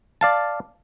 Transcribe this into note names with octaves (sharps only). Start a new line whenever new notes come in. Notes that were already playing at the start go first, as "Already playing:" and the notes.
D5 F5 A5